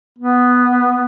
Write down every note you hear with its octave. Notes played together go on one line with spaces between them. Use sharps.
B3